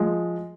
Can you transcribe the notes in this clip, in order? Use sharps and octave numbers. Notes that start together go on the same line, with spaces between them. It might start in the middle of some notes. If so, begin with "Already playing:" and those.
Already playing: F3 G#3